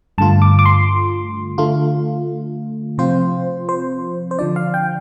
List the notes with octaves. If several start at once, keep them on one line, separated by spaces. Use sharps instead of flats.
G2 D3 A3 F4 A5
D6
D6
C6
D3 A3 F4
C3 F3 C4 F4 C5
C5
C5
D3 F3 D4 D5
F5
G5